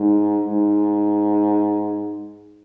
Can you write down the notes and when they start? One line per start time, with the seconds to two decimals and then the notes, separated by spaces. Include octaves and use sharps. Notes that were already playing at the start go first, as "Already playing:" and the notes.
Already playing: G#2
0.45 G#2